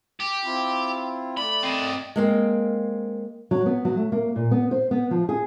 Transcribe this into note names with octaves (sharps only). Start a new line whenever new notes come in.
G4
C4 E4 F4
A3 D5 B5
C4 D#5
G#3 A#3 C4
F#3
B3
F#3
A3
A#3
A#2
B3
C5
B3
F3
G#4